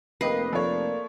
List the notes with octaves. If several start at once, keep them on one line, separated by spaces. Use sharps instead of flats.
F1 A#3 G4 B4 D#5 C7
F3 A3 A#3 C#5 D5